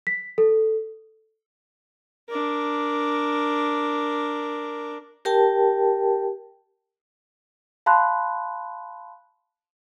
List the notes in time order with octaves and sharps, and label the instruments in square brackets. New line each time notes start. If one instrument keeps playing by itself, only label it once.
[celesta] B6
A4
[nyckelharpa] D4 A#4
[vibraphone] G4 A#4 G5 A5
[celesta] F5 A5 B5 C6 F#6